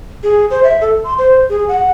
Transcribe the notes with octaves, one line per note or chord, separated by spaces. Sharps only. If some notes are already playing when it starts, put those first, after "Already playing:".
G#4
C5
E5
A4
C6
C5
G#4
F#5